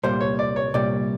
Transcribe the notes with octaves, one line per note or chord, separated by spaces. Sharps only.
C2 A#2 G3 C5
C#5
D5
C#5
C2 A#2 G3 D5